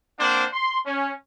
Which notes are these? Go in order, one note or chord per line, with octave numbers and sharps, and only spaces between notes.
A#3 C4 D4 C5 F#5
C6
C#4